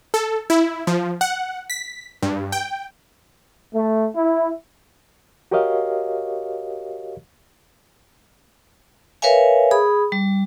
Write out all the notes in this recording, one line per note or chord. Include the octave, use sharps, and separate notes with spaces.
A4
E4
F3
F#5
B6
G2
G5
A3
E4
F#4 G4 A#4 C#5 D#5 F5
A#4 B4 C#5 E5 F5 G#5
G#4 B5 D#6
G3